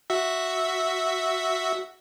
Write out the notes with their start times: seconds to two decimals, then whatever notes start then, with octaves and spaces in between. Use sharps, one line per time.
0.10 F#4 E5